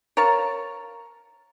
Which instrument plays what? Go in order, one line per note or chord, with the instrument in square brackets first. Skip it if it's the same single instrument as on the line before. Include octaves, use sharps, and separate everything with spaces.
[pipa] A#4 C#5 F5 A5